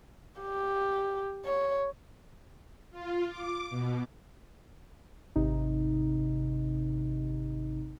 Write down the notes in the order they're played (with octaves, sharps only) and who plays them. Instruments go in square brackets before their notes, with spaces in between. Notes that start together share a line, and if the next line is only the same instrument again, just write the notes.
[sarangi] G4
C#5
[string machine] F4
D6
B2
[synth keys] G#1 C3 D#4